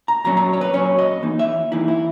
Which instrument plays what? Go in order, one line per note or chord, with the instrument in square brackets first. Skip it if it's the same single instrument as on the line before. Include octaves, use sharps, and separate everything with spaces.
[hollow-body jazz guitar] A#5
A#2 F#3 C#4 A#5
A#5
C#5
B4
A#2 F#3 C#4 C#5
D#5
E3 A#3 D#4
E5
E3 A#3 D#4 E4
E4